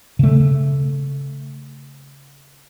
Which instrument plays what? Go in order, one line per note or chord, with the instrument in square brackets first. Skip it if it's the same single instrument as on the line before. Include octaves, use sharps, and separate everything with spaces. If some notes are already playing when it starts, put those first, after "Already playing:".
[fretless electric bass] C#3 A3